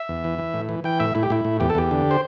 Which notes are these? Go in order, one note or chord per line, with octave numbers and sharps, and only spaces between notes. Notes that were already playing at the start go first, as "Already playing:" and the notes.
Already playing: E5
E2
E3
E3
A2
E3
E3 G5
A2 E5
A2 E4
G4
A2 E4
A2
E2 G4
A4
E2 G4
D3
C5